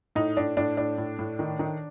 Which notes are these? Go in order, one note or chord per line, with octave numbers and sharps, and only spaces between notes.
A2 D#4
A2 D4
A2 D4
A2 D4
A2
A2
D#3
D#3